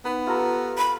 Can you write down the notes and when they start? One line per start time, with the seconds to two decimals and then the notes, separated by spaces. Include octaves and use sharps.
0.05 B3 D#4 B4
0.27 F4 G4 A4 B4 A#5
0.78 B5